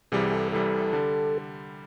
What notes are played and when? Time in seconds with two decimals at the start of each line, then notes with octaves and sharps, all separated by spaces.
0.12 C2 C3 E3 G3 G#4
0.32 A4
0.52 C2 C3 E3 G3 A4
0.93 D3 G3